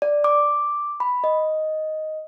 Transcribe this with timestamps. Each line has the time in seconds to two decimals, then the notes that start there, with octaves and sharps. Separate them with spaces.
0.02 D5
0.24 D6
1.00 B5
1.24 D#5